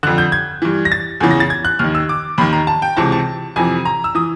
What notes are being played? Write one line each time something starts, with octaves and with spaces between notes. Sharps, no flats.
F2 D3 F#6
G6
G#6
G2 E3
A#6
A6
E2 C#3 E3
A#6
A6
G#6
F#6
D#2 D#3 F6
E6
D6
D#2 D#3 B5
A#5
A5
G5
C#2 C3 E3 A5
A5
F2 C3 E3 G#5
A#5
E6
E3 D#6